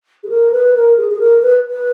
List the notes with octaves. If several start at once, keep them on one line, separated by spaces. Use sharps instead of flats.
G#4
A#4
B4
A#4
G#4
G#4
A#4
B4
B4